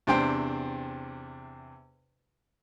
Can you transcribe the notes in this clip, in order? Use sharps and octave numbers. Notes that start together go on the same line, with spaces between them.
E2 C3 D4 C5 G5 C6